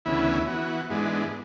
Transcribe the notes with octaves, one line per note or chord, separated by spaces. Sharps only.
D2 C#3 E3 B3 E4
E3 B3 F#4
G#2 E3 G#3 B3 D4